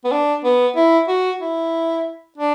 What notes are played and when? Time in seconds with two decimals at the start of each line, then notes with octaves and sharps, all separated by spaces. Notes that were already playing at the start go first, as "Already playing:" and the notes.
0.04 B3
0.11 D4
0.44 B3
0.76 E4
1.08 F#4
1.41 E4
2.38 D4